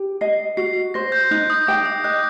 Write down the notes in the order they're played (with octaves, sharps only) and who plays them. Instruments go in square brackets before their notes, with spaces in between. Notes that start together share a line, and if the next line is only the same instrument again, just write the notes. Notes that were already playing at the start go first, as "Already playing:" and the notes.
Already playing: [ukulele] G4
[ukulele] D#5 [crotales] C7
[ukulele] F#4 [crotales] C7
[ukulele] C5 [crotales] A#6
[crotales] G6
[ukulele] D#4 [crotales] F#6
[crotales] D#6
[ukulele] G5 [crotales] D6
[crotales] D#6
[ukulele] D#5 [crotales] F#6